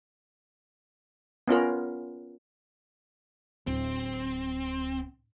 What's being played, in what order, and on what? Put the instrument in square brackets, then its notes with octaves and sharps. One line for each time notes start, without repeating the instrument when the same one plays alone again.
[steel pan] B3 C#4 F4 A#4
[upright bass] D1 [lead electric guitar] C4